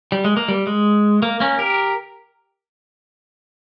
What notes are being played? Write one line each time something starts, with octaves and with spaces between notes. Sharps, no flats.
G3
G#3
A#3
G3
G#3
A#3
A#3 C#4
G4 A#4